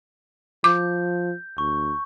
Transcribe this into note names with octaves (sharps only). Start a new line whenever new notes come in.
F3 D6 G6
D2 C#6